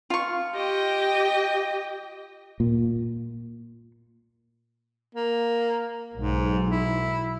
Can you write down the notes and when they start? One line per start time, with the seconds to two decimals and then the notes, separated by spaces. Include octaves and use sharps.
0.10 F4 C#6
0.54 G4 D#5 G5
2.60 A#2
5.15 A#3
6.14 B1 G#2 F#3
6.71 E4